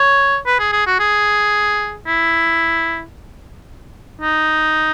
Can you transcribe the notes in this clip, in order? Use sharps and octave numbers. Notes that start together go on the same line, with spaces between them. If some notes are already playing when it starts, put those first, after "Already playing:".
Already playing: C#5
B4
G#4
G#4
F#4
G#4
E4
D#4